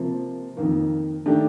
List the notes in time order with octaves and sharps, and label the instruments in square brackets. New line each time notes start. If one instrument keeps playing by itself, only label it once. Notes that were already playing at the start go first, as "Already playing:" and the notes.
Already playing: [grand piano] C3 F3 A#3
F2 D#3 A#3
D#3 A3 D4 G4